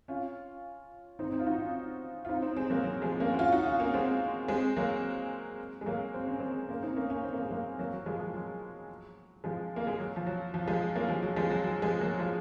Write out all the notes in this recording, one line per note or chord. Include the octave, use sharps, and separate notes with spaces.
C#4 F4
C4 D#4
C4 D#4
F4
D#4 F#4
C#4 F4
F4
C4 D#4
C4 D#4
G#3 C4
F#3 A#3
F#3
F3 G#3
A#3 C#4
F#4
C#4 F4
D#4 F#4
C#4 F4
A#3 C#4
G#3 C4
G#3 C4
F#3 A#3
G#3
F#3 A#3
C4
C#4
G#3 C4
A#3 C#4
C4 D#4
A#3 C#4
A#3 C#4
C4
A#3
G#3
F#3 A#3
F#3 A#3
F#3
F3 G#3
F3
F#3
F3 G#3
A#3
G#3
F#3
F3
F#3
F3
F3 G#3
F#3 A#3
F3 G#3
F#3
F3 G#3
F#3
F#3
F3 G#3
F#3 A#3
F3 G#3